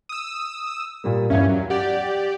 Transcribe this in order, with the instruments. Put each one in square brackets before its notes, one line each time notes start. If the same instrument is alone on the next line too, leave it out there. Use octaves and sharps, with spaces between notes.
[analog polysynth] D#6 E6
[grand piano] A#2 G3 A#3
[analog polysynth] E2 G2 C#4 [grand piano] E5 F5 G#6
[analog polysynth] F#2 F#3
[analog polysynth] G4 D5 [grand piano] F#5